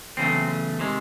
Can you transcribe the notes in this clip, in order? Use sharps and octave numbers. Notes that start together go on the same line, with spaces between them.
E2 C#3 F#3 A3 C4
C3 D#3 G#3